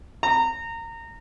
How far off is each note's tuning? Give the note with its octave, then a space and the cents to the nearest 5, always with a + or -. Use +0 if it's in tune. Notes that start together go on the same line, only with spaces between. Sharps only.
A#5 -25